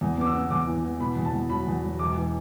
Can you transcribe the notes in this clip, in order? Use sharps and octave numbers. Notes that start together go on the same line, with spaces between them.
E2
B3 D6
E6
B3
E2 D6
E3
E3
B2 B5
E2
A5
E2
F#3 B5
E2
F#3
E1 D6
E3